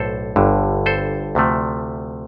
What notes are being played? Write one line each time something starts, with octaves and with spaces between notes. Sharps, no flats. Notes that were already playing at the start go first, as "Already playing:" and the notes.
Already playing: B1 A2 A4 C5
G1 G2 D3
A4 C5
D2 C3 F3 A3